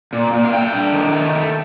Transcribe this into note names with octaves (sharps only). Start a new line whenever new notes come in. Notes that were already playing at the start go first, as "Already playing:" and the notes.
A#2
A#2
F5
A3 G5
D4
D#3
A3
A3